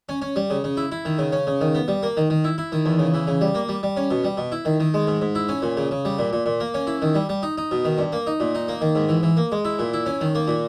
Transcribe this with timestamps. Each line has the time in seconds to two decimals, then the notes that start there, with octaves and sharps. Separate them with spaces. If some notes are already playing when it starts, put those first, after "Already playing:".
0.09 C#4
0.22 C#4
0.36 G3
0.50 C#3
0.64 C#3
0.77 E4
0.92 E4
1.05 D#3
1.19 C#3
1.32 C#4
1.47 C#3
1.61 D#3
1.74 B3
1.88 G3
2.03 A#3
2.17 D#3
2.30 D#3
2.44 E4
2.58 E4
2.72 D#3
2.86 E2
2.99 C#3
3.14 E3
3.27 C#3
3.41 G3
3.55 A#3
3.69 G3
3.83 G3
3.96 C#4
4.11 B2
4.24 G3
4.37 B2
4.52 E4
4.65 D#3
4.80 D#3
4.94 G#3
5.07 G#2
5.21 G#2
5.35 E4
5.49 C#4
5.62 A#2
5.77 C#3
5.91 C#3
6.05 G3
6.19 A#2
6.33 A#2
6.46 A#2
6.60 A#3
6.74 C#4
6.87 E4
7.02 D#3
7.15 G3
7.29 G3
7.43 D#4
7.58 D#4
7.71 B2
7.85 D#3
7.98 G2
8.12 A#3
8.27 D#4
8.40 A#2
8.55 D#4
8.68 A#3
8.81 D#3
8.95 G#2
9.09 E3
9.23 E3
9.37 A#3
9.52 G#3
9.65 E4
9.79 A#2
9.93 E4
10.06 C#4
10.21 D#3
10.35 A#3
10.48 A#2